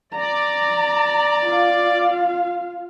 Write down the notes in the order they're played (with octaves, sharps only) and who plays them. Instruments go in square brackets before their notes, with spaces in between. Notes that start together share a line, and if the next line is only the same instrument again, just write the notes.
[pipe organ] D5 [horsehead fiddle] A#5
[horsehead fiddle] F4 F5